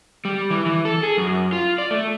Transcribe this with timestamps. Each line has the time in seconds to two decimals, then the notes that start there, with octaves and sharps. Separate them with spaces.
0.25 G3
0.51 E3
0.66 E3
0.85 A4
1.03 G#4
1.18 F#2
1.53 F4
1.78 D5
1.91 A3